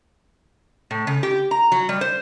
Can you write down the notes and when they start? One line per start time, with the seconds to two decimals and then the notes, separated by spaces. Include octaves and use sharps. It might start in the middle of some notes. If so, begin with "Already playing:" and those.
0.91 A2
1.07 C#3
1.23 G4
1.51 A#5
1.72 F#3
1.89 G3
2.01 C5